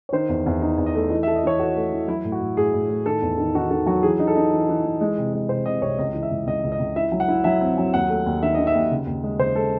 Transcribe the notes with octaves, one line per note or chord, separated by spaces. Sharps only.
C#5
D#3 C5
E2
E2
D#4
E2
D#5
A3
E3 D#5
E5
A4
D#5
E3 C#5
F#4 A4
A3
E3
F#3 E4
A2
F#4
A2
A2 G#4
A2
A2
D#3 A4
E2
D#3
D#3 F#4
D#3 A4
F#3 F#4
E3 G#4
D#4
A4
D#4
E3
E3
E3
G#3
C3
G#3
C3 C5
C3 D#5
C2 C#5
C#2 D#5
E3
E5
C#2
C#2 D#5
C#2
D#5
C#2
E4 E5
F#3
F#5
E4
F#3 E5
C4
F#3
D#2 F#5
A3
D#2
D#3 E5
D#5
D#3
E5
D#2
C#3
D#2
G#3
C#3 C5
G#3 A4